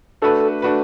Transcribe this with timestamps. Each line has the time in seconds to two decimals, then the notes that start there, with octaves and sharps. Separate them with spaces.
0.22 A3 D4 F#4 A4 B4
0.62 A3 D4 F#4 B4